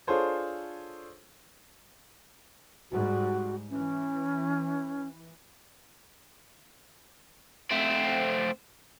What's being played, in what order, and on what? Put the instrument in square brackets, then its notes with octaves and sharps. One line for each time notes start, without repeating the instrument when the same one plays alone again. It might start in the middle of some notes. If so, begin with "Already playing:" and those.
[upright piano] D4 F4 G#4 A4 C5 C#5
[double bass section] G#2 G3 [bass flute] F#4
[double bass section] E3 [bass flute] C#4
[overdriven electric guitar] A3 C4